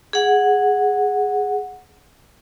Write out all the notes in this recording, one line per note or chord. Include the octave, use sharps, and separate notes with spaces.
G#4 F#5